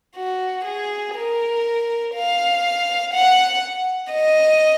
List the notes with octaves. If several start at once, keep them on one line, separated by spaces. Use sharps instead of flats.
F#4
G#4
A#4
F5
F#5
D#5